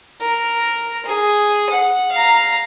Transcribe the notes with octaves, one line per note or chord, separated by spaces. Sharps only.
A#4
G#4
F#5
F5 A#5